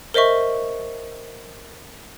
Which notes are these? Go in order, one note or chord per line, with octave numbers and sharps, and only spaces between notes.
A#4 C5 D#5 E5 C#6